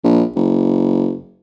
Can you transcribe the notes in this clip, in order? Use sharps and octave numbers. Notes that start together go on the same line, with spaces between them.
A#1
F#1